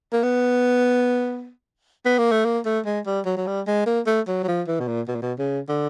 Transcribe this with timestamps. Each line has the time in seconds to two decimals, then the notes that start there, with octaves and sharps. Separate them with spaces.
0.13 A#3
0.23 B3
2.05 B3
2.18 A#3
2.32 A3
2.45 A#3
2.65 A3
2.86 G#3
3.06 G3
3.26 F#3
3.37 F#3
3.47 G3
3.67 G#3
3.86 A#3
4.07 A3
4.28 F#3
4.44 F#3
4.48 F3
4.68 E3
4.80 B2
4.88 A#2
5.08 B2
5.15 A#2
5.22 B2
5.39 C#3
5.69 D3